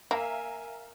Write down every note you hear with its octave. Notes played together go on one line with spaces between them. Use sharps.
A#3 A#4 E5 F5 G#5 A#5